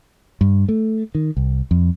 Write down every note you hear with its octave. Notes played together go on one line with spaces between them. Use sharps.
G2
A3
D#3
C2
F2